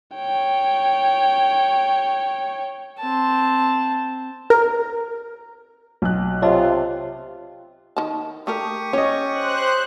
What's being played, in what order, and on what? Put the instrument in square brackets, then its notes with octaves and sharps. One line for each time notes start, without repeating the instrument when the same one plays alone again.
[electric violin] C#5 G5
[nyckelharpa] C4 A5
[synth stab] A#4
[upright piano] B1 F#6
[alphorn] C3 [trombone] F4 [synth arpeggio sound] C#5 D#5 A5
[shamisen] D#3 A5
[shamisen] A3 A4 A#4 [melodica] G4 C#6 D#6
[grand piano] C#4 D#5 [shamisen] C#5
[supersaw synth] C5 F#6